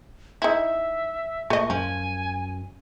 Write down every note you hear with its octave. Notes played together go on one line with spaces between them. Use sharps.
D#4 E4 E5
A#2 A3 D#5 C#6
F#2 F3 G#5